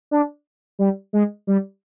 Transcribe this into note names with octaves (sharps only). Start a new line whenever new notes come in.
D4
G3
G#3
G3